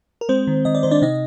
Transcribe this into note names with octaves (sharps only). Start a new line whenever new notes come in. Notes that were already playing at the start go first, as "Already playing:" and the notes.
A#4
G#3 C4 C5
D#3
D#3 D#5
D5
D#3 C5
D4 D5
C3 D#4 D#5